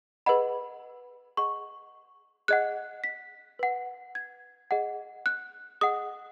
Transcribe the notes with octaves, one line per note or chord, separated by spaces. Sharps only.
G#4 B4 D#5 F#5 B5
G#4 D#5 F#5 C#6
G#4 D#5 F#5 F#6
B6
B4 F#5
G#6
G#4 D#5 F#5
F#6
G#4 D#5 F#5 D#6